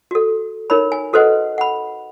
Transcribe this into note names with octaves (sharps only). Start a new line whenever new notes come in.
F#4 A4
D#4 A#4 C#5 B5
G#5
F#4 A4 B4 C5 D#5 F#5
F#5 B5